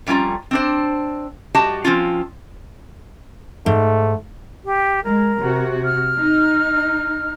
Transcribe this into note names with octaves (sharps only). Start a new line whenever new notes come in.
F2 G3 C#4 E4 F4 A#5
C4 D4 C5
G2 F#4 G4 D#5 A5
F3 C4 C#4 F4
G#2 A3
G4
G#3 A#4
C3 F#4
F6
D#4